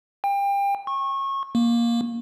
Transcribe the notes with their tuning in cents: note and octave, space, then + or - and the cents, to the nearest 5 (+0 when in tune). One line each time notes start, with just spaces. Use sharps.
G5 +30
C#6 -25
A#3 +10